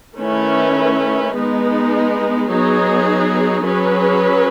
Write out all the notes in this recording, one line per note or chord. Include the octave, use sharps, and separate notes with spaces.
D#3 A3 C#4 E4 B4
G#3 B3 D#4
F#3 B3 D#4 G#4
F#3 C#4 G#4 B4